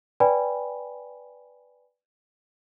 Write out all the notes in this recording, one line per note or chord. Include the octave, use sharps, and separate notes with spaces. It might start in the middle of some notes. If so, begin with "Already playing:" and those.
B4 D5 G5 G#5 B5